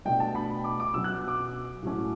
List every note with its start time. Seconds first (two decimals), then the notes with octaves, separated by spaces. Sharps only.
0.05 B2 A3 D4 G5
0.20 A5
0.35 B5
0.64 D6
0.80 D6
0.94 B2 F#3 C#4 E6
1.04 F#6
1.28 D6
1.83 A2 F#3 A3 C#4